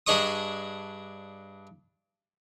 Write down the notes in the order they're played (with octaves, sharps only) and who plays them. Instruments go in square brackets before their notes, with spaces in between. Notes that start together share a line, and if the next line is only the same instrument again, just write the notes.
[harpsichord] G2 D4 G#4 D#5 C#6 D#6